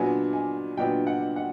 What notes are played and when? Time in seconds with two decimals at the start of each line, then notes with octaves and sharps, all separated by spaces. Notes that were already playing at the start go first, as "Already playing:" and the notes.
Already playing: A#2 F#3 B3 D4 G#5
0.33 G#5
0.77 A#2 F#3 B3 D4 G5
1.07 F#5
1.36 F#5